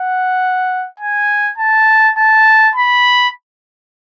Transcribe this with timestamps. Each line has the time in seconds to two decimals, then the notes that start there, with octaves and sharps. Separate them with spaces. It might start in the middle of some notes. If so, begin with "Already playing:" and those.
Already playing: F#5
1.00 G#5
1.58 A5
2.18 A5
2.76 B5